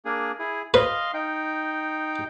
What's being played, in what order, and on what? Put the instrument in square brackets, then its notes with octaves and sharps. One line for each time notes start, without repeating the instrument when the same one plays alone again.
[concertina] A#3 D4 G#4
E4 G#4
[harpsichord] B4 [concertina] D#5 F5 C6
[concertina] D#4 G5